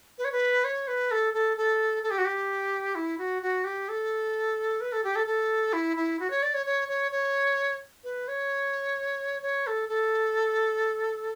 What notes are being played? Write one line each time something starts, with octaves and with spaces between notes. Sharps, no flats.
B4
C#5
B4
C#5
B4
A4
A4
A4
A4
G4
F#4
G4
E4
F#4
F#4
G4
A4
B4
A4
G4
A4
A4
E4
E4
F#4
C#5
D5
C#5
C#5
C#5
C#5
B4
C#5
C#5
A4
A4